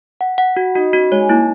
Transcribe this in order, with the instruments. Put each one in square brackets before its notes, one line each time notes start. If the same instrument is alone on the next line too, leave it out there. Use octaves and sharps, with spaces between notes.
[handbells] F#5
F#5
F#4
[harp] D#4 [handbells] F#4
[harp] C#4 [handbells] F#4
[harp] G#3 [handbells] C#5
[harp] A#3 [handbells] E4